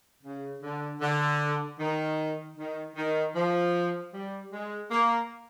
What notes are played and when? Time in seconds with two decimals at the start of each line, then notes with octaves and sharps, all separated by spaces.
0.24 C#3
0.63 D3
1.01 D3
1.80 D#3
2.57 D#3
2.97 D#3
3.36 F3
4.14 G3
4.53 G#3
4.91 A#3